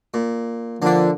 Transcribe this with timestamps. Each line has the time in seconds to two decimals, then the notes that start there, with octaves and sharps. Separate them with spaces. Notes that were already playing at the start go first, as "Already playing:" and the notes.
0.14 A#2
0.82 D3 F3 A#3 D4